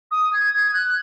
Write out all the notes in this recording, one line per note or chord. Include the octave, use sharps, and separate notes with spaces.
D#6
G#6
G#6
F#6